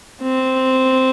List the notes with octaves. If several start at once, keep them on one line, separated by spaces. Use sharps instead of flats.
C4